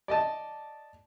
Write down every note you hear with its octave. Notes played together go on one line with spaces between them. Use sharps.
D5 D#5 A5